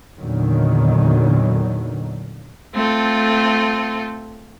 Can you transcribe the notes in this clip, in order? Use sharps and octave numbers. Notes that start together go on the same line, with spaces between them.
E2 A#2 D3 D#3 F#3
A3 C4 F4 A4